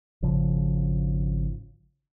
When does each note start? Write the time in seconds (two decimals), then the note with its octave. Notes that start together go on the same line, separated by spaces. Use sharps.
0.22 G#1 C#3 F3